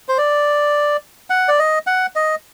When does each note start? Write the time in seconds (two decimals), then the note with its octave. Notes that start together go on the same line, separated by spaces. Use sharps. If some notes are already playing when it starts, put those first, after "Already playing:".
0.08 C5
0.18 D5
1.30 F#5
1.48 D5
1.59 D#5
1.87 F#5
2.16 D#5